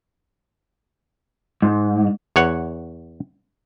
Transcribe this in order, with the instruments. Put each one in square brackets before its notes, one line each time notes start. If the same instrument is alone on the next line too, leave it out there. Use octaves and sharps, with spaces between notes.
[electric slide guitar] G#2
[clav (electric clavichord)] E2 C#5 F#5